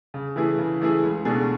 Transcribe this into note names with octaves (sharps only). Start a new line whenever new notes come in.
C#3
E3 A3 E4 G#4
C#3
E3 A3 E4 G#4
C#2
B2 A3 D4 G#4